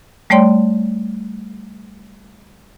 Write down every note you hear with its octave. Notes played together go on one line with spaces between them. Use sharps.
G3 A3 C#5 D5 G5 C6